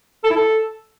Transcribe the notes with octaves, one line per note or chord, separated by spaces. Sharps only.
A4
E4
A4